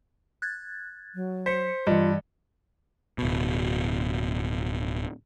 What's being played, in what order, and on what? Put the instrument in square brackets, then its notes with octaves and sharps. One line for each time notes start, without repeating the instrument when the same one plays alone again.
[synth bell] F#6 G#6 A6
[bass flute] F#3
[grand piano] C5 [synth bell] B6 C#7
[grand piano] G2 [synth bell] E3 D#5 [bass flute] F4
[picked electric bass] D1 B2